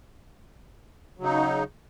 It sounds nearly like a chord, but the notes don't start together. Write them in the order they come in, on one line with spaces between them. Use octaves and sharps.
F#3 C#3 D#4